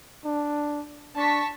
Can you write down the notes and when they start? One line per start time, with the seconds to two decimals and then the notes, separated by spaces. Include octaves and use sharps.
0.24 D4
1.16 D4 A5 C#6 B6